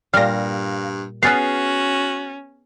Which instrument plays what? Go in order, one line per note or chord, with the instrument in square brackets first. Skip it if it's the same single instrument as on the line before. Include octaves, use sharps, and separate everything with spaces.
[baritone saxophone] G2 [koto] A#2 G3 [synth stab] F5 A#6
[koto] B3 G#4 B4 [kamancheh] C#4 [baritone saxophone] F#4 [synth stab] F6 A6 C7